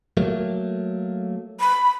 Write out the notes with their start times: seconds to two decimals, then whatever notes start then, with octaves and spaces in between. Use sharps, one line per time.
0.17 F#3 A3 A#3
1.60 B5